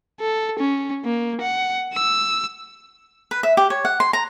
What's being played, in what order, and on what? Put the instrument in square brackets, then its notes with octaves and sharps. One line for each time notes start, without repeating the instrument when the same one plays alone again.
[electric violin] A4
C#4
A#3
F#5
E6
[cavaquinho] B4
E5
G4
C#5
F#5
C6
A#5